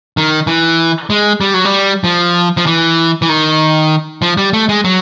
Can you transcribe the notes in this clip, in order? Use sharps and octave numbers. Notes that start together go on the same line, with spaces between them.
D#3
E3
G#3
G3
F#3
G3
F3
F3
E3
E3
D#3
F3
G3
A3
G#3
F#3